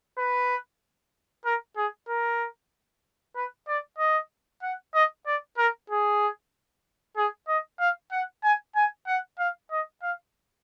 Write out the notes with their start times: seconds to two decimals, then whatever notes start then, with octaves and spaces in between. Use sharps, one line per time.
0.18 B4
1.45 A#4
1.77 G#4
2.09 A#4
3.36 B4
3.68 D5
3.99 D#5
4.63 F#5
4.94 D#5
5.26 D5
5.58 A#4
5.90 G#4
7.17 G#4
7.48 D#5
7.80 F5
8.12 F#5
8.43 G#5
8.75 G#5
9.07 F#5
9.39 F5
9.71 D#5
10.02 F5